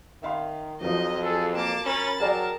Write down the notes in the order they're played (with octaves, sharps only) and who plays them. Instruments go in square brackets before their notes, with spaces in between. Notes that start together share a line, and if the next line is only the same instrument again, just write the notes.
[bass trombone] D#3 [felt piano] E5 F5 C6
[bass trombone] F2 [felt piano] F3 F#3 [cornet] D#4 [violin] D#5
[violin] G#4 [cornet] A4
[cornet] A#3 [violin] A5 D6
[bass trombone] C#4 [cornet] A#4 [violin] B5 A6
[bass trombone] F#3 [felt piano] G#4 D5 G5 [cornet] A#4 [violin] A5